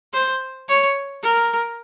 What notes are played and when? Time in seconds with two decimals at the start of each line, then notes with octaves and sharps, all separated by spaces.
0.13 C5
0.69 C#5
1.23 A#4